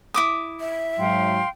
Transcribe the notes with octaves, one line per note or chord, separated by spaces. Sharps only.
E4 D6 D#6
E5
G#2 F#3 F5 G5 C6